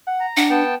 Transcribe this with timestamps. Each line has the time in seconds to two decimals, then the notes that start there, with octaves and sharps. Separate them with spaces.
0.07 F#5
0.20 A#5
0.37 D4 F#5
0.50 B3 G5 A5